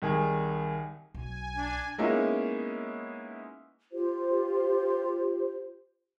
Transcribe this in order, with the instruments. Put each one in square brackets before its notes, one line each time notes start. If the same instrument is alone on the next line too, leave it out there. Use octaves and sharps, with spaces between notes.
[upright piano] C2 D#3 G#4
[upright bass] B1 [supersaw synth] G#5
[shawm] D4
[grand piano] G#3 A#3 B3 C#4 D#4 E4
[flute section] F4 G4 C5